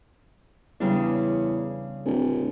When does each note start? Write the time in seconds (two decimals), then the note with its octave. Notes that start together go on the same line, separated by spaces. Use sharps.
0.80 E2 C#3 G3 D4
2.05 D1